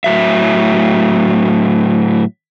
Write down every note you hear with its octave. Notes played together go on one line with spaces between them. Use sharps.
A2 F#3 E5